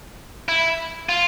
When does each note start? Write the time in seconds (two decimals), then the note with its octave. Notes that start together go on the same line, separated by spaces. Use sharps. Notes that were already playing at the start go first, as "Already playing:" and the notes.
0.49 E4
1.09 F4